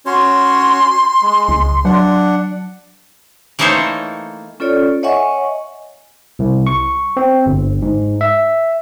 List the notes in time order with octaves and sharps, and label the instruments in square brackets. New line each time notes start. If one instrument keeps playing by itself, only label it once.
[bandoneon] C#4 F#4 C#5 [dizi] C6
[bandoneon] G#3
[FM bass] C#2
[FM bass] F#3 [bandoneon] D4 F#5
[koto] E3 A3 A#3 D#4 C5 C#5
[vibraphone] C#4 F4 A4 C#5 D5
C#5 D#5 E5 F#5 G#5 C#6
[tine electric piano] C2
C#6
C4
G1
G#2
E5